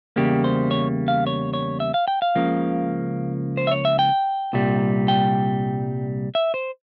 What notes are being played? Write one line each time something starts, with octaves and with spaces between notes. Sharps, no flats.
E2 C#3 G3 A#3 G4
C5
C#5
F5
C#5
C#5
E5
F5
G5
F5
C#2 C#3 F3 A#3
C5
E5
C#5
E5
G5
C2 A#2 G3
G5
E5
C5